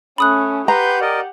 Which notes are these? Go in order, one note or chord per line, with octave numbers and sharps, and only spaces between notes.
A3 C#4 B5 D#6 F#6
G4 B4 F#5 A#5 C6 G6
A#4 D5 D#5